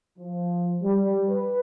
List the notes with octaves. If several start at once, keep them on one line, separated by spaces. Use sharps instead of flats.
F3
G3
B4